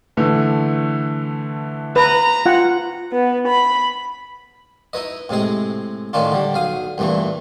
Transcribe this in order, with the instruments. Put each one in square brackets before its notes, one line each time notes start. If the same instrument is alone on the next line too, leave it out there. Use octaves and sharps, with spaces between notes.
[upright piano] D3 E3 A3
[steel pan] B4 [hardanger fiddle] A#5
[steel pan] F4 F#5
[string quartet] B3
B5
[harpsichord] D#4 E4 B4 D#5
A2 C3 G#3 G#4
A2 D#3 C#4 D4 F4
D3 G3
B1 F5 D#6
C2 G2 A#2 E3 A3